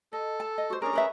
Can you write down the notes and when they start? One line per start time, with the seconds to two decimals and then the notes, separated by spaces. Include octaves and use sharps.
0.13 A4 D#5
0.40 A5
0.58 D#5
0.70 F#4 C5
0.82 C#4 D4 G#4 A#4 A#5
0.93 A#4 B4 E5